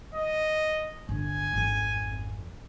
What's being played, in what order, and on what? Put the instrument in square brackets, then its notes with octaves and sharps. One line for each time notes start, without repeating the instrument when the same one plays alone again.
[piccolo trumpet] D#5
[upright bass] G1 [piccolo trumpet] G#5
[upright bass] G#1 F2